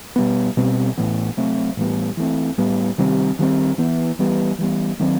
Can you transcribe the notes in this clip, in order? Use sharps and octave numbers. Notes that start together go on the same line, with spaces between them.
B2 G3 B3
B2 G3 C4
A2 E3 B3
C3 F#3 A3 C4
A2 E3 G3 B3
E3 A3 C4
A2 G3 B3
C3 D#3 G3 C4
D#3 G3 C4
E3 B3
E3 G3 B3
E3 G3 B3
D#3 F#3 A3 C4